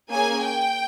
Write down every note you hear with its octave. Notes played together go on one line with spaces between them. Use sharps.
A#3 C#4 G#4 G#5
G5